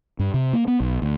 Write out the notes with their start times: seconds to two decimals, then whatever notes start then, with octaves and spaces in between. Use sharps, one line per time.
0.19 G2
0.34 C3
0.53 A#3
0.68 B3
0.80 B1
1.02 D2